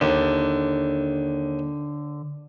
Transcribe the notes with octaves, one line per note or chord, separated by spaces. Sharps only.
D#2 D3